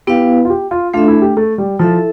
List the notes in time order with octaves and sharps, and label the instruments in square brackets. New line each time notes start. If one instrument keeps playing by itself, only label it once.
[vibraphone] B3 E4 B4 F5 [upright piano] G4
[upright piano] F4
G4
F4
[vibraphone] A3 D4 A4 E5 [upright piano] F4
[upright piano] E4
G4
A3
G3
[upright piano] F3 [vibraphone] E4 A4 E5